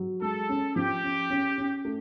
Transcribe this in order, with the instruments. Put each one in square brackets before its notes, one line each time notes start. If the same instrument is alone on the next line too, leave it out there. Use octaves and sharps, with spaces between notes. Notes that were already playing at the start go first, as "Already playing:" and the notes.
Already playing: [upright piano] F#3
[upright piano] G#3 [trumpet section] A4
[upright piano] C#4
[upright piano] F3 [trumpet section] G4
[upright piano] C#4
C#4
C#4
A3